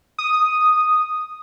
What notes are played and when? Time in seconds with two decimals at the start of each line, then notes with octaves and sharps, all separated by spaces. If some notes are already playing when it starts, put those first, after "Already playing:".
0.19 D#6